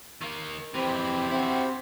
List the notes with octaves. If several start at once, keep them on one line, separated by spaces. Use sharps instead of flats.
D#3 A#3
F2 E3 C4 G4 C5 B5
C4 E4 F#4